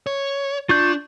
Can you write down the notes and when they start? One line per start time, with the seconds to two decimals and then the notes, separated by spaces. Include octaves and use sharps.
0.07 C#5
0.69 D4 F4 C#6 G6